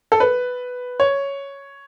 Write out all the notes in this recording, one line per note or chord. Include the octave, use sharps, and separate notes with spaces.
A4
B4
C#5